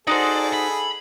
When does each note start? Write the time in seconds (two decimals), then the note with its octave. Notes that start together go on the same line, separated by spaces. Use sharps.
0.07 D#4 F#4 G#4 A4 C5 D5
0.53 B5